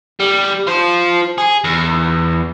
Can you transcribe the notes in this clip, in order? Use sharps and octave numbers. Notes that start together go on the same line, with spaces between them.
G3
F4 C5
G#4
E2